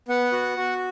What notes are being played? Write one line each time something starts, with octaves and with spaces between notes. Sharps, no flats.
B3 F#5
F#4
F#4